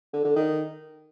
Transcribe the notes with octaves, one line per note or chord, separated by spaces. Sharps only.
D3
D3
D#3